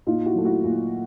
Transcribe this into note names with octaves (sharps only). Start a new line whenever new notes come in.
A#2 D#4 F4
E4 F#4
F#3 A3
E4 F#4
A#2